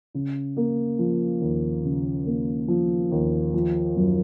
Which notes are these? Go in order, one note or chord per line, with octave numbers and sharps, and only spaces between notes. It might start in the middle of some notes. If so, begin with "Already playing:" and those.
C#3
A#3
F3
D#2
C#3
A#3
F3
D#2
F3
F#2